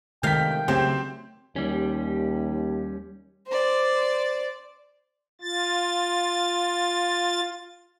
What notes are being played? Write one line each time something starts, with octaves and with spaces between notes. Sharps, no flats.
C3 D#3 G#3 A3 F5 G5 G6 B6
C#3 F#3 A3 C4 G4 C5
D#2 G3 C#4
C5 D5
F4 A6